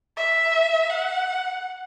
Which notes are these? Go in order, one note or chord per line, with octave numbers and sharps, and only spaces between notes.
E5
F#5